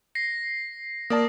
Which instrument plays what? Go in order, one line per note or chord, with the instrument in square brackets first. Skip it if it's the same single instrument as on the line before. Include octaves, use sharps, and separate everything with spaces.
[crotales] A#6 C7
[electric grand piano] A#3 D5 A5 [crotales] D#6